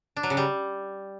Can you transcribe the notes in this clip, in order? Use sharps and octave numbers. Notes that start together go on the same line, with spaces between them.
D4
F#3
C#3
G3